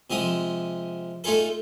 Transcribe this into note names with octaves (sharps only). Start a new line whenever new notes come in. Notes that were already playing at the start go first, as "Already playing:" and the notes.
C3 F3 G#3 D#6
A3 D#4 F4 G#4 A4